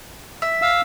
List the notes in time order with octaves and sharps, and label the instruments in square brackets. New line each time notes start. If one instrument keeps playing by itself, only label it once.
[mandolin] E5
[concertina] F5 E6